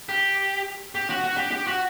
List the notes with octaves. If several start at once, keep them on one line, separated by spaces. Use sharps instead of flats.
G4
G4
F#4
F#4
G4
G4
F#4